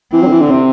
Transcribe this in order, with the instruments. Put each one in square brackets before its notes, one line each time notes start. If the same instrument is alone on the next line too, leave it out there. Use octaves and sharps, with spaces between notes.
[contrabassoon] E3 [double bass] C4
[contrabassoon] F#3
D3
E3
D3
C3